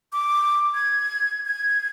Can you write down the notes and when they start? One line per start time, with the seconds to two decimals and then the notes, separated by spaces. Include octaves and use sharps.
0.13 D6
0.74 G#6
1.46 G#6